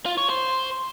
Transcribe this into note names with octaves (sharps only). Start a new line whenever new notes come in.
F4
C#5
C5